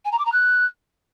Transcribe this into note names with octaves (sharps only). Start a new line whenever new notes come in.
G#5
A#5
D6
A#5
F#6